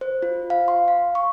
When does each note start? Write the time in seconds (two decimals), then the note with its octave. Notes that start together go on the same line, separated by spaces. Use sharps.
0.01 C5
0.22 F4
0.50 F5
0.68 C6
0.88 F5
1.15 C#6